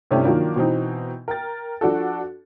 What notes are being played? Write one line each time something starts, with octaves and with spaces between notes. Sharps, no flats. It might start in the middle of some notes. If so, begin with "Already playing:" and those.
G2 C3 A3 C#4 E4 G4
D#3 F3 F#3 A#3 D4
B2 E3 C4 D#4
A#4 G5 A6
F3 D4 F#4 A4